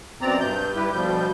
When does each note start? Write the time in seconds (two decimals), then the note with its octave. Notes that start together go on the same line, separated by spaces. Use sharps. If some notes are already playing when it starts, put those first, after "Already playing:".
0.21 F#2 B2 C4 D5 A#5
0.40 G2 G6
0.75 G3 E4 G4 B4
0.93 D2 B2 F3 G3 G6